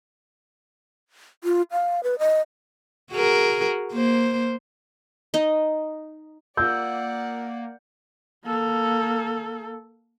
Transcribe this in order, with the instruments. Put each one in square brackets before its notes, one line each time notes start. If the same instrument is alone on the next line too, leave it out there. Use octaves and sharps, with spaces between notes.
[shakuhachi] F4
F5
B4
D#5
[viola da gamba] F#4 G#4 A#4
A#3 C5
[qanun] D#4 D#5
[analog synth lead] A#3 [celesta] F4 E6 [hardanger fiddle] D5 F#5 [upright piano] G6
[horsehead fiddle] A#3 A4